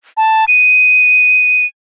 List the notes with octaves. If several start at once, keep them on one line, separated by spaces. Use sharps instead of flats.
A5
D#7